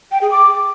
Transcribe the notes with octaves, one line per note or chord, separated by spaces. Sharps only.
G5
G#4
D6